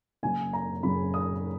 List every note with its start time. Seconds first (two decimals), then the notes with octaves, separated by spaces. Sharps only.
0.23 F#1 F#2 C#3 F#3 G#5
0.53 A#5
0.83 F#1 F#2 C#3 F#3 B5
1.14 D#6